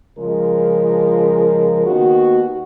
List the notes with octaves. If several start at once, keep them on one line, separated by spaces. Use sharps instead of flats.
C#3 F3 G#3 F4 A#4
D#2 D#3 B3 F#4